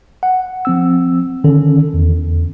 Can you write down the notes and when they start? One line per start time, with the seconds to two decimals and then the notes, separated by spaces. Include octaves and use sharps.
0.23 F#5
0.65 F3 C4 E6
1.44 D3 D#3 C#4 A4
1.94 E2